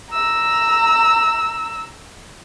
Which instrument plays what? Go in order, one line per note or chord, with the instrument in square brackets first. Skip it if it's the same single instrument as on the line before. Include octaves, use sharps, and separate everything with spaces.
[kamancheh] A#5 E6